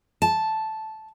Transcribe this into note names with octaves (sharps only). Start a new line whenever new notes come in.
A5